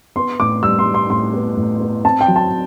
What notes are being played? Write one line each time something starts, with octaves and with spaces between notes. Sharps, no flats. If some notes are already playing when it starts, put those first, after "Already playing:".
B3 C6
A2 D6
G3 E6
C6
G3
C6
A2 C6
B3
A2
B3
C4 A5
G5
F#3
A5